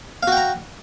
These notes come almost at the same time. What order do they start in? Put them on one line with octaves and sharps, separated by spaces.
F5 F#4 G5 A#5